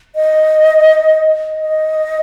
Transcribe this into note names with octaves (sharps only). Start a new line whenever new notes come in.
D#5
D#5